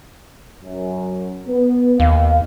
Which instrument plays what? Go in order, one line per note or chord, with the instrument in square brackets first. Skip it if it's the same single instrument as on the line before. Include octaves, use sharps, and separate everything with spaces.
[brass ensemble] F#2
B3
[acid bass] D#2 [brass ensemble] F5